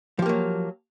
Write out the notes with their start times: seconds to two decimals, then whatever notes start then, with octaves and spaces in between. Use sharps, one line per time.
0.19 F3
0.22 G4
0.26 A#3
0.29 F#3